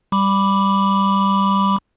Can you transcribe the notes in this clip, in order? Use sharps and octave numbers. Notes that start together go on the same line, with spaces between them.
G3 B5 D6